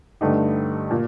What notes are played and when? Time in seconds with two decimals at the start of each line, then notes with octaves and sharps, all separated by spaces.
0.21 G2 D3 A3 D#4 G4
0.91 A#2